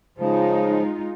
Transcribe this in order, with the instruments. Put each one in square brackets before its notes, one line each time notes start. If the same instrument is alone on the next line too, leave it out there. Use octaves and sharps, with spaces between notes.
[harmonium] C#3 F3 [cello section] G#3 D#4 F4